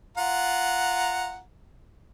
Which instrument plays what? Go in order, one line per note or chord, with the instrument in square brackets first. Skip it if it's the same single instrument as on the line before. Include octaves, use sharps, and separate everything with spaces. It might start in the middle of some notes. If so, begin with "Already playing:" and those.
[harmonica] F4 F#5 A#5